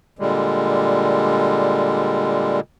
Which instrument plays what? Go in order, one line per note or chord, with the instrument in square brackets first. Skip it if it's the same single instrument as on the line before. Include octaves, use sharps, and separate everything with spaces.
[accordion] A#2 D3 G3 G#3